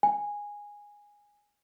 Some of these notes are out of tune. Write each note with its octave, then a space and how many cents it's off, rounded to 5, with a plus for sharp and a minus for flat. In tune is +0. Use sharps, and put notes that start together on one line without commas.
G#5 -10